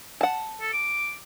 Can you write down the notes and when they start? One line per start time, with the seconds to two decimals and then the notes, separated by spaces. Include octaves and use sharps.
0.21 F#5 A5
0.61 A4
0.73 D6